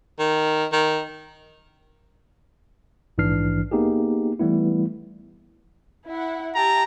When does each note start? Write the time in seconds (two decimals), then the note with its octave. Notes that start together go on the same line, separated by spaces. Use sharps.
0.19 D#3
0.72 D#3
3.18 A#1 G#2 E3 D4 F6 C7
3.71 A#3 B3 D#4 G4 G#4
4.39 E3 G3 A3 B3 E4
6.08 E4 F#5
6.55 G4 E5 A5 A#5